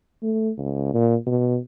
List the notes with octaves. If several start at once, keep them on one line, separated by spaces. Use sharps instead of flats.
A3
C#2
A#2
B2